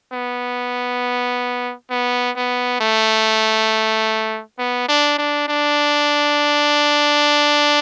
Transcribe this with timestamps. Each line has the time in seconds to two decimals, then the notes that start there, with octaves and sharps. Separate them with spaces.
0.13 B3
1.90 B3
2.36 B3
2.81 A3
4.59 B3
4.88 D4
5.18 D4
5.48 D4